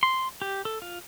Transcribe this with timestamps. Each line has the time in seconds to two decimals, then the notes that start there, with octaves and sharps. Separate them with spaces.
0.03 C6
0.42 G4
0.65 A4
0.82 F4